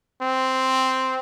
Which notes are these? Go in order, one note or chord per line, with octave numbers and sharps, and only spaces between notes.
C4